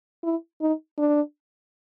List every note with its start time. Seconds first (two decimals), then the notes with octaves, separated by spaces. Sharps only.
0.24 E4
0.61 D#4
0.98 D4